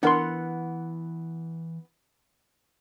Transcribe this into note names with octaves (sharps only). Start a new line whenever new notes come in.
E3 B3 D4 A#4 F#5 C6